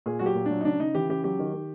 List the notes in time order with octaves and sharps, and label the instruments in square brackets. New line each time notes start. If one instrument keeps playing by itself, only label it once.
[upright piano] A#2 G#4
F#3 F#4
G4
A#2
F#3 D4
D#4
C#3 D4
C#3 D#4
E3 G4
C#3 G4
F#3 G4
D#3
D#3